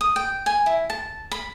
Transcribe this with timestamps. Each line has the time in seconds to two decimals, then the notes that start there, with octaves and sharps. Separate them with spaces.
0.01 D#6
0.16 G5
0.46 G#5
0.66 E4
0.90 A5
1.31 B5